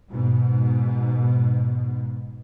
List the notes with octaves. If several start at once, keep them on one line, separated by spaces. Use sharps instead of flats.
G#2 B2